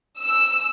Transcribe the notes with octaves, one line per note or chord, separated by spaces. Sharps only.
E6